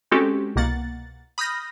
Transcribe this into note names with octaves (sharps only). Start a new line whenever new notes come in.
G#3 C4 C#4 F#4 G4 A4
C2 B2 A#3 F#5 A6
B5 D#6 F6 G6 A#6